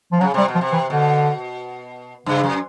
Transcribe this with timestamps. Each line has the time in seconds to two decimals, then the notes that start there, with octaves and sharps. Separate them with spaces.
0.12 F3
0.20 C#3 F#3
0.34 C3 G3
0.48 B2
0.55 F3
0.61 C3
0.73 E3
0.89 B2 D3
2.26 G2 C#3
2.43 F#2